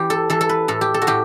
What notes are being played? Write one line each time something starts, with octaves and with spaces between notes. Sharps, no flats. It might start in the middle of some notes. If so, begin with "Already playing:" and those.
Already playing: E3 G4
A4
E3 A4
A4
B4
A2 A4
G4
A4
F#4
A2 G4